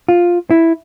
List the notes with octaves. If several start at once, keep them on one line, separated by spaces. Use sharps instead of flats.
F4
E4